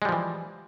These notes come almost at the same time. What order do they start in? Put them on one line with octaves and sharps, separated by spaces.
G#3 G3 F3 E3